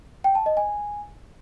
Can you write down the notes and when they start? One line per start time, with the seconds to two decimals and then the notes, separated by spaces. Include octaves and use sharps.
0.24 G5
0.35 A5
0.46 D#5
0.57 G#5